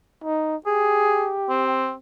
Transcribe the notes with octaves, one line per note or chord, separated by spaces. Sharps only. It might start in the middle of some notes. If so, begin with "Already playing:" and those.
D#4
G4 G#4
C4